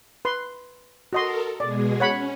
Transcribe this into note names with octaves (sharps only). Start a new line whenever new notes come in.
B4 C6
F#4 A4 A#4 D#5 C6
B2 G#3 G#4 D5
C#4 C#5 F#5 B5